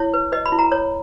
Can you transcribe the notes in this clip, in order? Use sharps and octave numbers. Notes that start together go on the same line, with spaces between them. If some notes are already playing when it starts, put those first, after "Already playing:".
Already playing: E4 C#5
B4
B4 D#5
B5
E4
A#5
C#5